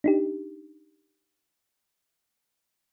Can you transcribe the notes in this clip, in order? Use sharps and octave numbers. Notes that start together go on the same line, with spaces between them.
D4 D#4 G4